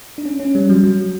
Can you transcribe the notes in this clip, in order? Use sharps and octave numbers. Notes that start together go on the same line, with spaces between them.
D4
C#4
C#4
G3
F#3
F#3